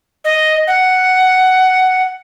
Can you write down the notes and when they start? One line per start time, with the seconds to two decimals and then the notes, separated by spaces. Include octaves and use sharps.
0.25 D#5
0.67 F#5